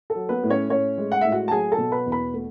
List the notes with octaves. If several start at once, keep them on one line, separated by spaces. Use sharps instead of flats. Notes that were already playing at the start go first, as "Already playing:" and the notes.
A4
F#3
B3 B4
A2
C#4 C#5
A2 C#4 C#5
G#3
F#5
A2 E5
F#4 F#5
A5
F#3 G#4 G#5
A4 A5
B2
B4 B5
E2
B4 B5
A3